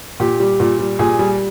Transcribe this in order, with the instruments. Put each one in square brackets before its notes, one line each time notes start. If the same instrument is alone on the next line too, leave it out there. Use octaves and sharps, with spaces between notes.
[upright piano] A#2 G4
G3
A#2
G3
A#2 G#4
G3